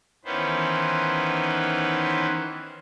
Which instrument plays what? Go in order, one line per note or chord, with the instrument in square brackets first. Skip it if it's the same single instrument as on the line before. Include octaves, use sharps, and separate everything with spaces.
[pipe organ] D#3 E3 B3 C#4 B4 C5